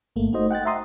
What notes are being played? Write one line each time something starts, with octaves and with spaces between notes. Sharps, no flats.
G1 A3 A#3
A3 D#4 F#4 C5 D#5
F#5 G5 F#6 A6
E5 A#5 C6 D#6